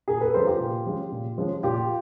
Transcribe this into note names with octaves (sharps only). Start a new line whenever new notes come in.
A#2 G#4 A#4
A4 B4
F3 G#3 C#4 A#4 C5
F4 G4
A#2
F3 G#3 C#4
A#2
F3 G#3 C#4
A#2 F4 G4